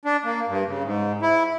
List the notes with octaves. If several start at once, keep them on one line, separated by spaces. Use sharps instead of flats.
D4
A#3
G2
C#3
G#2
E4